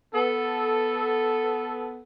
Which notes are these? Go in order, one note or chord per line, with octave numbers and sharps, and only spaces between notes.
B3 A4